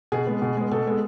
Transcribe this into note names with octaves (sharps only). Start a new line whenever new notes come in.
B2 G#4
G#3 B3
B2
G#3 B3
B2 A4
G#3 B3